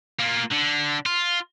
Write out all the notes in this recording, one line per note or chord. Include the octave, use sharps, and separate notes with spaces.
A#3 F4
D3
F4